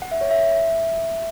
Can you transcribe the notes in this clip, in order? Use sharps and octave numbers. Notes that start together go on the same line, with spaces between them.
F#5
E5
C#5
E5